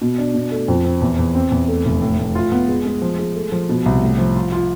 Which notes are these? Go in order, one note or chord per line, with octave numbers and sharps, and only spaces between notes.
B2
D4
B2
A3
F2
C4
E2
E2
C4
E2
A3
F1
A2
A2
F4
B3
G#3
G#3
F3
G#3
A3
F3
B2
C2
A2
F3
F4
F4